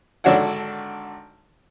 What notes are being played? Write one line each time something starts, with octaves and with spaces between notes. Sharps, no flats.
G#1 D3 D4 F#4 C#5 F#5